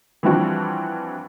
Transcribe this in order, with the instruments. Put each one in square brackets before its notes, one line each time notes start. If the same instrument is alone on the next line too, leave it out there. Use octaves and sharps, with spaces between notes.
[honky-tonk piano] E3 F3 G3 C4 D4 F#4